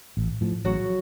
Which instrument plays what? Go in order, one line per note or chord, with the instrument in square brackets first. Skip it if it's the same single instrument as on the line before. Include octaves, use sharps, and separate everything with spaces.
[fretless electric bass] A1
A2 F3
[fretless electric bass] A1 [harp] F#3 F#4